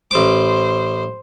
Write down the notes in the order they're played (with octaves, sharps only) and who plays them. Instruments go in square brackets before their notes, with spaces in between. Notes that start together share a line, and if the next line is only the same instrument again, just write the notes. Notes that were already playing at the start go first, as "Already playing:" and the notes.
[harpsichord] A1 D6 [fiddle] C5